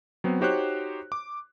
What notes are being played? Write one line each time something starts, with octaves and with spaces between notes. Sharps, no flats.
F#3 B3 C4
D#4 F#4 G4 C5 C#5 F#6
D6